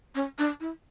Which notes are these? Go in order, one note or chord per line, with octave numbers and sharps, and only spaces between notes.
C#4
D4
E4